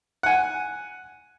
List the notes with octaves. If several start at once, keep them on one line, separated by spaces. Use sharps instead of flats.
F#5 G#5